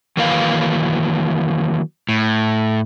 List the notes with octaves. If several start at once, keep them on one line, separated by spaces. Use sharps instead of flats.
D#3 E3 F#3 A#3 B4 F5
A2